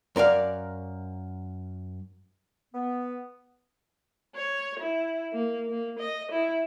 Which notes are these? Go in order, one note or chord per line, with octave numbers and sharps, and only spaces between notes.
F#2 A#4 D5 F5
B3
C#5
E4
A#3
A#3
D#5
E4